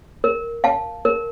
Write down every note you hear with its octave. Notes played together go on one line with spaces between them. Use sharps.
A#4
F5 A5
A#4